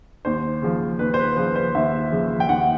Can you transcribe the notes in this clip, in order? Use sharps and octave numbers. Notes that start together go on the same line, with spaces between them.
D#2 C5
C#3 F3
D#2 B4
C5
B4
C#3 F3 B4
C5
D#2 E5
C#3 F3
G5
D#2 F#5